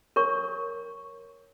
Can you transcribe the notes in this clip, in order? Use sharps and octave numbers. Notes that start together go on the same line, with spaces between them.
A#4 C#5 C#6